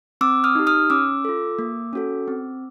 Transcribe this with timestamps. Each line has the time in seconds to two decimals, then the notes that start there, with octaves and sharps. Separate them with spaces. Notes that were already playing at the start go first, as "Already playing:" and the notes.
0.21 C4 D6 E6
0.44 D#6 F6
0.55 D#4 G4
0.67 D#6 F6
0.90 C#4 D6 E6
1.25 F4 A4
1.59 A#3
1.93 C#4 F#4 A4
2.28 C4